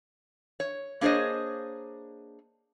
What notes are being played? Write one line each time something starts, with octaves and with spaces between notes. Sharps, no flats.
C#5
A#3 D4 G#4 C5 C#5 D#5